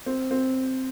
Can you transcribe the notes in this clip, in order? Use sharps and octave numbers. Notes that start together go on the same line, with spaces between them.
C4
C4